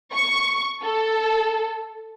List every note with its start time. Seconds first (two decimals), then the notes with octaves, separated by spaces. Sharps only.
0.14 C#6
0.83 A4